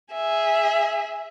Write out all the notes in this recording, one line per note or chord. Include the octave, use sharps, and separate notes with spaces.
G#4 E5